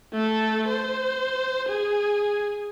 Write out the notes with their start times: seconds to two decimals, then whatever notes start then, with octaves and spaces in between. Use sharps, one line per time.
0.13 A3 A4
0.68 C5
1.68 G#4